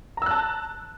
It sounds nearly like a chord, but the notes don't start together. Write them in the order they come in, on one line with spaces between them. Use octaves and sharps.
A#5 E6 F#6 A5